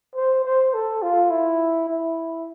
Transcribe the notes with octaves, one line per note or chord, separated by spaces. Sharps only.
C5
C5
A4
F4
E4
E4